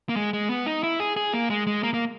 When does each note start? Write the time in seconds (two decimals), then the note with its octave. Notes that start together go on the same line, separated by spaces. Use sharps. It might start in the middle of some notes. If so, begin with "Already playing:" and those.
0.09 A#3
0.16 G#3
0.33 G#3
0.50 B3
0.66 D#4
0.83 E4
1.00 G#4
1.16 G#4
1.33 A#3
1.50 G#3
1.67 G#3
1.83 A#3
1.94 A#3